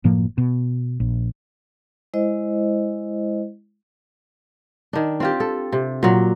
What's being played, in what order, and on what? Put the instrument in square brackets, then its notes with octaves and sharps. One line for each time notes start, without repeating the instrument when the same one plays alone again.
[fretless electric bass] F#1 A2 F3 A#3
B2
A#1
[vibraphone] G#3 E4 C5 D#5
[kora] D#3 D4
C4 F4 G4
A4
C3
A#2 F#3